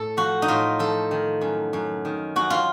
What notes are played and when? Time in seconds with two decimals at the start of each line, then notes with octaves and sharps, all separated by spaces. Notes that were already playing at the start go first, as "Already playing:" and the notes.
Already playing: A2 A4
0.17 F3 F#4
0.42 D#4
0.48 A2 F4
0.79 F3 A4
1.11 D#3
1.41 F#2
1.73 F#2
2.05 D#3
2.36 F#2 F#4
2.50 F4